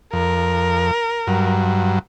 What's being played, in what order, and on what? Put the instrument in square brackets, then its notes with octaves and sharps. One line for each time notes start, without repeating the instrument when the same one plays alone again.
[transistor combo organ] F2 [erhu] A#4
[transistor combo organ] G2 F#3